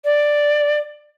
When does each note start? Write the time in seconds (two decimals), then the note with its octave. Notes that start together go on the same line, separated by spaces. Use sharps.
0.04 D5